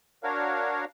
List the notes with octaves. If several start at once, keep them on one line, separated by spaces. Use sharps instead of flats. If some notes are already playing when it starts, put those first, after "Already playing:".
D4 F#4 A#4 C#5 F5